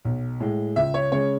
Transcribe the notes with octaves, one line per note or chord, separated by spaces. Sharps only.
B1
A2 G#3
C#2 E5
C#5
C#3 G#3 C#5